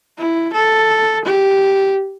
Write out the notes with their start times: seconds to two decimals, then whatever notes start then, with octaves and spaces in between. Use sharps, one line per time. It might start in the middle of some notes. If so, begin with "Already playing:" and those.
0.18 E4
0.54 A4
1.25 G4